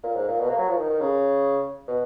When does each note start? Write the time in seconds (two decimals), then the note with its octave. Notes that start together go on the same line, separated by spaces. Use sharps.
0.03 A#2
0.15 G#2
0.28 A#2
0.40 B2
0.49 A#3
0.58 F#3
0.67 F3
0.77 D#3
0.89 D#3
1.01 C#3
1.88 B2